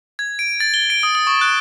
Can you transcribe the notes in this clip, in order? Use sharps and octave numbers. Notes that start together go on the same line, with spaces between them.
G#6
D7
A6
G7
D7
D#6
D#6
C#6
F#6